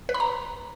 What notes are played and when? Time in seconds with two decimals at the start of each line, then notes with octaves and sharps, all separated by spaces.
0.09 B4
0.14 B5
0.20 A#5